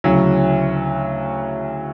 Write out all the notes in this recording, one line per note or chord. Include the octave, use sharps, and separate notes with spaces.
D2 C#3 F#3 C#4 E4